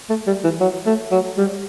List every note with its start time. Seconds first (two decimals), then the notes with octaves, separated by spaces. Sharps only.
0.10 A3
0.27 G3
0.44 E3
0.60 F#3
0.86 A3
1.12 F#3
1.38 G3